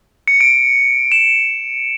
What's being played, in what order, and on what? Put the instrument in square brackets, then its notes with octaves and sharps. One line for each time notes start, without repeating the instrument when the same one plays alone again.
[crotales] C#7
D7
E7